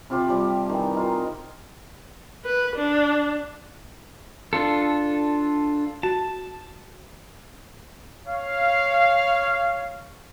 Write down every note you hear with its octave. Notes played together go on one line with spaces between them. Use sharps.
C3 F4 G4 B5
F3 G3
D#3 E3
D#4 F4 A#4
B4
D4
D4 F4 A4
F#4 A5
C#5 F5